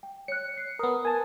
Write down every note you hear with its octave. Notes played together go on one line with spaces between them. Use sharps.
G5
C#5 F#6 C#7
C7
B3 A#4 D#6
A#4 G#5 A5